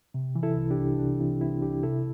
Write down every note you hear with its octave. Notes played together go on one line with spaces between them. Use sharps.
C3
E3
E4 A4
C2
D4 G4
C2
C3 D4
E3 C4 E4
C2 C4 E4
C2 D4 G4
C3 E4 A4